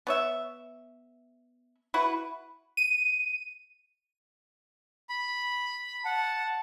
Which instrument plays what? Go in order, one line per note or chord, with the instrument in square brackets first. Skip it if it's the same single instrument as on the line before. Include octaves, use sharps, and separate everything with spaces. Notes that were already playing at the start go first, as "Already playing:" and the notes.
[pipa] B3 C#5 E5
E4 F#4 B4
[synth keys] D#7
[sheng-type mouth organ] B5
[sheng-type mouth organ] F#5 [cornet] A5